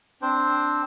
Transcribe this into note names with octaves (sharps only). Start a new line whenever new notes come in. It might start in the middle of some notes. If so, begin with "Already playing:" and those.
C4 D4 C5